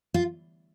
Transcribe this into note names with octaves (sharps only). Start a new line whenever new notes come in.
F4